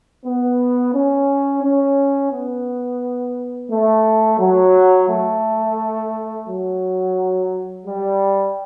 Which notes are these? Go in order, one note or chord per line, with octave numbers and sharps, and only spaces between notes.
B3
C#4
C#4
B3
A3
F#3
A3
F#3
G3